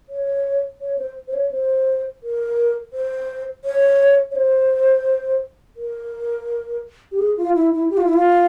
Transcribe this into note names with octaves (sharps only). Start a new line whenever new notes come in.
C#5
C#5
C5
C5
C#5
C5
A#4
C5
C#5
C#5
C5
A#4
G4
G#4
F4
E4
E4
G4
F4
E4
F4